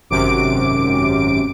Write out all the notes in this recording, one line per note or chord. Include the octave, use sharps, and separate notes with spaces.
G#1 F#2 C3 D6 D7